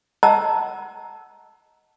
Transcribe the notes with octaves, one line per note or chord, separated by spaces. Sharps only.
D#5 F#5 A5 A#5 E6